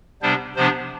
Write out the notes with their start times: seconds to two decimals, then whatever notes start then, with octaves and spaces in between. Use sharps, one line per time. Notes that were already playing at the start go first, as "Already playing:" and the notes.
0.22 C3 G3 B3 D4 C5
0.56 C3 F3 B3 D4 C5